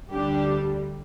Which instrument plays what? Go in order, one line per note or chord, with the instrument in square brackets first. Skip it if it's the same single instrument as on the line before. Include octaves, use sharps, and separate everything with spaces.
[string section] D2 D3 G3 D4 G4